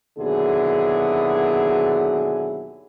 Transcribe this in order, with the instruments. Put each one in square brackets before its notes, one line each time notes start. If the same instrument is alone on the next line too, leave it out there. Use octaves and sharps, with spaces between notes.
[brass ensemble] D#2 B2 D3 F#3 E4 G#4